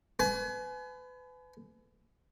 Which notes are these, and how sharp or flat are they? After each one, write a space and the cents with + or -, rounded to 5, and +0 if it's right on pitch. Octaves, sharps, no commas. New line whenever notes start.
B4 +30 G#5 +35